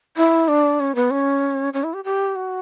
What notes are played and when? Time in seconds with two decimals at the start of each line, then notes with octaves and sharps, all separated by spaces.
0.17 E4
0.48 D4
0.80 C#4
0.95 B3
1.11 C#4
1.74 C#4
1.84 E4
1.94 G4
2.04 G4
2.36 F#4